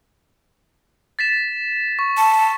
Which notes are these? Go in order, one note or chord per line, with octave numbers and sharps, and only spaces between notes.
A6 B6 E7
C#6
A5